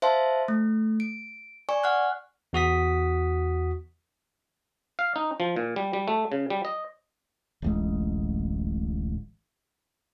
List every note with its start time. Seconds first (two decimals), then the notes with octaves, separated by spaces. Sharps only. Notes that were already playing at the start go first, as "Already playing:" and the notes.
0.02 C5 E5 F5 A5 C6
0.48 A3
1.00 D7
1.69 D5 G#5 C#6
1.84 F#5 F6 F#6
2.53 E2 F#4 D#6 B6
4.99 F5
5.16 D#4
5.40 F3
5.56 A#2
5.76 G3
5.93 G3
6.08 A3
6.32 C#3
6.50 G3
6.65 D#5
7.62 D1 A1 G#3